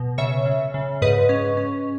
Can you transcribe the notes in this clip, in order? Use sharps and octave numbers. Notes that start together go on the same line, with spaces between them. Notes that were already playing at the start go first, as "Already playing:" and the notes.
Already playing: B2
C#3 C#5 E5
C#3
C#3
G#2 B4 D#5
C#4
C#4